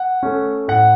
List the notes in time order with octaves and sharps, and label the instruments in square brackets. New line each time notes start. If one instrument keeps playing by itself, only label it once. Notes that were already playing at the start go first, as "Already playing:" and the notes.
Already playing: [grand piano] F#5
A3 C#4
A2 F#5